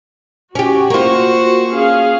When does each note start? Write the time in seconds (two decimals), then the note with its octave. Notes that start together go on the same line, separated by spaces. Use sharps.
0.55 C#4 F#4 G4
0.90 A#3 F4 C5 C#6
1.69 C#4 G#4 F5